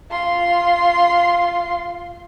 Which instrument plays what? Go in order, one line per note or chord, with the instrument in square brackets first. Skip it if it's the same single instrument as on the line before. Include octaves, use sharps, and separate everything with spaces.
[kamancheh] F4 C6